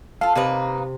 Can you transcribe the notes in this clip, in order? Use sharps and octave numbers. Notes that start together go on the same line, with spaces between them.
F4 A4 F5
C3 A#3 D#4 B4